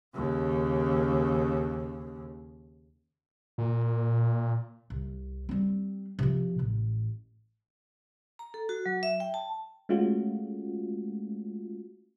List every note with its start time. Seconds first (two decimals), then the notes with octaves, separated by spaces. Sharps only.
0.15 D#2 C#3
3.58 A#2
4.90 C2
5.49 G3 C4
6.19 C3 F3
6.59 A1
8.39 A#5
8.54 A4
8.69 F#4
8.86 F#3
9.03 E5
9.20 G5
9.34 A5
9.89 G#3 A3 C#4 F4 F#4